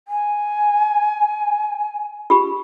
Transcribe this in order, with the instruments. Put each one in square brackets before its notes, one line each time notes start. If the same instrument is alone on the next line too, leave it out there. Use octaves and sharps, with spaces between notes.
[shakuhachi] G#5
[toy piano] F4 G4 B5